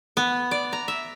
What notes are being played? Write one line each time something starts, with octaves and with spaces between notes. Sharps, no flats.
B3
D5
A#5
E5